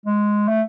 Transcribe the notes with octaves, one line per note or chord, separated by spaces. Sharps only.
G#3
A3